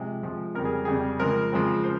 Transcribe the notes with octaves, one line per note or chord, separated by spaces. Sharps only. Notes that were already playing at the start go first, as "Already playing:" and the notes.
Already playing: C3 F3 G#3
C3 F3 G#3
F2 C#3 G3 A#4
G#4
F2 C#3 G3 G#4
C#3 F3 G#3 C4 A#4
C#3 F3 G#3 C4
C5